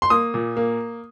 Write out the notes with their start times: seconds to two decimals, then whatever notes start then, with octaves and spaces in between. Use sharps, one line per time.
0.02 C6
0.10 A#3 D#6
0.34 A#2
0.57 A#3